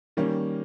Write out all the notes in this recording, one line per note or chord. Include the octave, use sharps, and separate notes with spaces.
D#3 G3 A#3 C#4